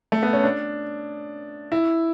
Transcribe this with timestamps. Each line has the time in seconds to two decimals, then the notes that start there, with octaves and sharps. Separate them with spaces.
0.12 A3
0.23 B3
0.33 C#4
0.44 D4
1.72 E4